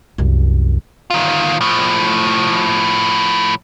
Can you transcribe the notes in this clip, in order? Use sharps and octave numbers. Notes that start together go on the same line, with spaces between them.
C2 F#2
D#3 F4
A2 F3